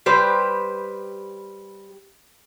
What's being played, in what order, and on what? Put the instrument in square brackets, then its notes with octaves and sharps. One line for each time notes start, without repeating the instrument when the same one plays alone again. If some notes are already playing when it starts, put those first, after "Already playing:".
[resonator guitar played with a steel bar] G3 G4 B4 C5